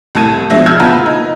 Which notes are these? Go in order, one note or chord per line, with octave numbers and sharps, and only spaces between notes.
C2 A2 A5 G#6 D#7
B2 F3 G#3 D4 E5 A#6
E6 F6 G6 G#6
F#1 B3 F4 B4 A5 A#5
D#4